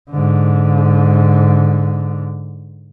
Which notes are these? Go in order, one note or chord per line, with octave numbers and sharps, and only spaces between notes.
G#2 D3